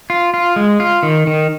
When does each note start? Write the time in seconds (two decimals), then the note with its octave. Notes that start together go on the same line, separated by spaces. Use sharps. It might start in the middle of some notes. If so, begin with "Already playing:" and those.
0.10 F4
0.34 F4
0.56 G#3
0.80 F4
1.03 D#3
1.27 D#3